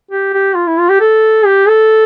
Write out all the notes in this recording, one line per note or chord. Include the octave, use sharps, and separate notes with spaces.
G4
G4
F4
E4
F4
G4
A4
G4
A4